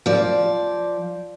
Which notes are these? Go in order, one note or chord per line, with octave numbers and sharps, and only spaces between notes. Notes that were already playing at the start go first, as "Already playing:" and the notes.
F3 D5